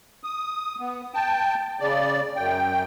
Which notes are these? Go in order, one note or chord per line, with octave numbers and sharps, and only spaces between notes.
D#6
B3
G5 A5
C#3 D5
F#2 G5